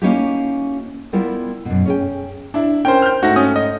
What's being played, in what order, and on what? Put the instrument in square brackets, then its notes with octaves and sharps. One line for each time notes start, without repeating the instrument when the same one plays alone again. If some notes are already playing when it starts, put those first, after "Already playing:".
[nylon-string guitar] A#3 C#4 D#4 E4 F#4 G4
G3 B3 E4 F4 A#4 G5
F#2 B2
C#4 G#4 G5
[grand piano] D4 E4
[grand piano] C#4 A#4 [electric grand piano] C5 G5
[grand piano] F6 G6
[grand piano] G#2 A3 A#6 [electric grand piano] F#4
[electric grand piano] C#4 D#6
D#5